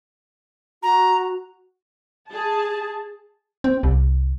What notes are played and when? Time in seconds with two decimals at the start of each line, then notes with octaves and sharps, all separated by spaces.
0.83 F#4 A#5
2.30 G#4 A5
3.64 C4
3.83 C2